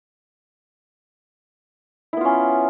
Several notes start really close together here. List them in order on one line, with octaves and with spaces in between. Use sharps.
E4 B3 F4 C#4